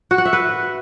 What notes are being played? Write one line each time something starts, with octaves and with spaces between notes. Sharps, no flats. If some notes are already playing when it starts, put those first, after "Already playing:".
F#4
F#5
E5
B4